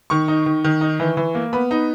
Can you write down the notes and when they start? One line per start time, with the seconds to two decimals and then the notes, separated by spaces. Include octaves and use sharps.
0.10 D#3 C#6
0.28 D#4
0.46 D#3
0.64 D#3
0.81 D#4
1.00 E3
1.17 E3
1.35 A#3
1.53 B3 B5
1.71 D#4